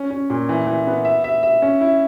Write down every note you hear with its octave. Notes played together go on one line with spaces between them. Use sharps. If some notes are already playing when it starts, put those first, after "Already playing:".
Already playing: C#4
C#4
A#2
E3
E3
B3
E5
E5
E5
C#4
E4